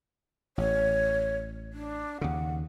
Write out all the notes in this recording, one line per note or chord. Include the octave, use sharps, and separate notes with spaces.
A1 C#5
D4
D#2 C#3 F#5